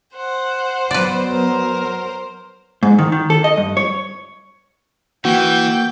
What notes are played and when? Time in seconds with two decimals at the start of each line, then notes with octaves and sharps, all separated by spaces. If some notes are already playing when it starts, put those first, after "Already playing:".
0.17 C5 F#5
0.91 F#3 B3 B4 D5
1.31 A#4
2.83 G#2
2.98 D#3
3.12 D#3
3.30 A4
3.44 D#5
3.57 G2
3.77 C#5
5.25 E3 A#3 F#4 G5 G6